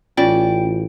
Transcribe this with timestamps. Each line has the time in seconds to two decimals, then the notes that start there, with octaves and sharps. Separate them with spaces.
0.17 A1 C#4 F4 D5 G5